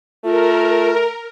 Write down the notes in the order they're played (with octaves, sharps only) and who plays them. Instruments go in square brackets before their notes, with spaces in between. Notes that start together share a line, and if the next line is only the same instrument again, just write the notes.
[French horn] A3 [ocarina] F4 [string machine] A#4